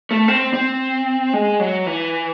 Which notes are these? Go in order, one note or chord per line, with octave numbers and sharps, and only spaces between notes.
A3
C4
C4
G#3
F#3
E3